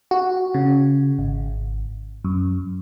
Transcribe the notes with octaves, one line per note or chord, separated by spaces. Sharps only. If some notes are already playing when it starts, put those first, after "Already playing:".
F#4
C#3
G#1
F#2